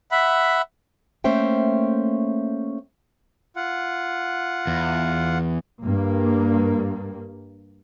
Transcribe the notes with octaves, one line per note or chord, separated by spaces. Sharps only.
E5 F#5 B5
A3 A#3 C#4 C5 E5 G5
F4 F#5
E2
G2 A#3